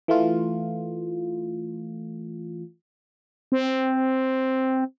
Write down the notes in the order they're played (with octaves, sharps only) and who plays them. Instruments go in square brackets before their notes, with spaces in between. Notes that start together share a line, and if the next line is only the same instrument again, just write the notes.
[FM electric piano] E3 A3 F4
[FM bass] C4